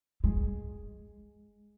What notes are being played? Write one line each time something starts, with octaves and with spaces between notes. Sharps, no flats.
G#3